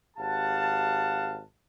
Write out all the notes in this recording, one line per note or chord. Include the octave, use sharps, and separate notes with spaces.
G#1 G4 F5 F#5 A5